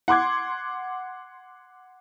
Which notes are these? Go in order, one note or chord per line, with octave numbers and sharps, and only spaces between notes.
F#5 C6 D6 G#6